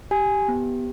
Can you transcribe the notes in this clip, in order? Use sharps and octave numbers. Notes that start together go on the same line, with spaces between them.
G4 G#5
B3